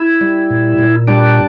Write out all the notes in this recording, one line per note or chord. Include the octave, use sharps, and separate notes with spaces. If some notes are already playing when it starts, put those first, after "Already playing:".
Already playing: E4
G3
A#2
A#2
G3 D4